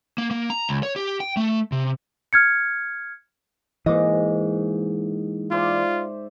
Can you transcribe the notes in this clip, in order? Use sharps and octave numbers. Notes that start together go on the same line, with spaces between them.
A#3
A#3
A#5
C#2
C#5
G4
G5
A3
C3
F6 G#6 C#7
G#2 E3 A#3 D#5 D6
F4 C5 D5 E5